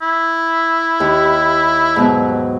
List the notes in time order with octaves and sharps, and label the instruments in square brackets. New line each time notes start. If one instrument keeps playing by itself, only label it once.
[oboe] E4
[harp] D#2
G#2 B2 F#3